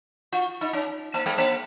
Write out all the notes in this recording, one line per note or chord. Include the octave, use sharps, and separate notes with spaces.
F4
D#4
C#4
A#3
G#3
A#3